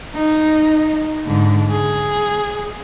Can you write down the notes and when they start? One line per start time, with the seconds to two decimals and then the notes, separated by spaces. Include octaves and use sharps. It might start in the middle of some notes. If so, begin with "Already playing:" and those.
0.14 D#4
1.26 G#2 D3
1.71 G#4